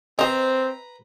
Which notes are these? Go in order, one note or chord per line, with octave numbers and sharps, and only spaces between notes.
C4 B4 C5 D#5 A#5